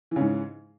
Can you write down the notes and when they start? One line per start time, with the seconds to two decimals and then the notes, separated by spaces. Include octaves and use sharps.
0.11 E3
0.16 C#3
0.21 G#2